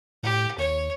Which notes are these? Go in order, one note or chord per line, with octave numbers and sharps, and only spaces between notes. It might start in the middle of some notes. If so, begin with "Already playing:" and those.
A2 G4
D#2 C#5